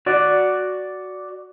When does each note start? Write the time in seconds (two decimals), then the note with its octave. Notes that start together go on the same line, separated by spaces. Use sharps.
0.06 F#4 D5